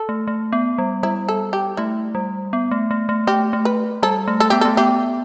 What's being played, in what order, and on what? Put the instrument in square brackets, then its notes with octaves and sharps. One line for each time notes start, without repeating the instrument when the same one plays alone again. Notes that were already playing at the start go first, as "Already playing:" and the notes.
Already playing: [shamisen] A4
[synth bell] A3
A3
B3
G3
[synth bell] G3 [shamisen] E4
[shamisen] A4
G4
[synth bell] A3 [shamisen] E4
[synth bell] G3
B3
A3
A3
A3
[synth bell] A3 [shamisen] G4
[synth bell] A3
[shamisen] B4
[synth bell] G3 [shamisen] A4
[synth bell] A3
[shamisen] A4
[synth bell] B3 [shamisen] G4
[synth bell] A3 [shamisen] A4
[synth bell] B3 [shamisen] G4